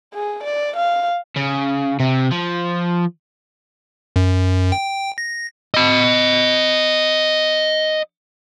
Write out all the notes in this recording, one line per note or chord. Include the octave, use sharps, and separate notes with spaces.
G#4
D5
F5
C#3
C3
F3
F#2
G5
A#6
D#5 B5